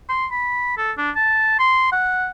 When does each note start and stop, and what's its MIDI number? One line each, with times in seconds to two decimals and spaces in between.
0.09 0.26 84
0.31 0.76 83
0.77 0.92 69
0.97 1.11 62
1.16 1.59 81
1.59 1.91 84
1.92 2.29 78